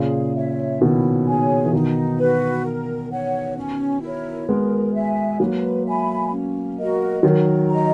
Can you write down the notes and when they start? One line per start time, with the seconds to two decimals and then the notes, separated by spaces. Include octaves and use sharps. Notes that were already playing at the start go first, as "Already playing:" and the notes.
Already playing: A#2 C#3 G#4
0.35 C#5 E5
0.81 B2 D#3 E4
1.27 G#4 C#5 G#5
1.65 E3
1.72 B2 D#3 D#4
2.19 F#4 B4
2.65 A#4
3.11 C#5 F#5
3.57 C#4
4.02 E4 A#4 C#5
4.48 G#3 B3 A#4
4.94 E5 G#5
5.40 F#3 A#3 B4
5.86 E5 G#5 B5
6.32 C#4
6.78 F#4 A#4 D#5
7.23 D#3 F#3 A#4
7.69 D#5 A#5